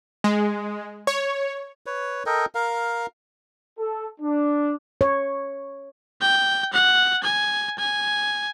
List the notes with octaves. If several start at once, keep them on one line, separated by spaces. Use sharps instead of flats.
G#3
C#5
B4 C#5
A4 A#4 D#5 G5
A#4 F5
A4
D4
C#5
G5
F#5
G#5
G#5